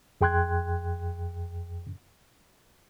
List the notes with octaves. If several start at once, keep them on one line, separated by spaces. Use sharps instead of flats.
F2 G#4 G5 C6 F#6 G#6